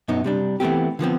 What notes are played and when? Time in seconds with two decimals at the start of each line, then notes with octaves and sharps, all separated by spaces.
0.08 F#2 B2 F#3 B3 D#4
0.24 C3 G3 D4
0.60 E3 A3 B3 C4 G4
0.99 D3 F3 B3 C4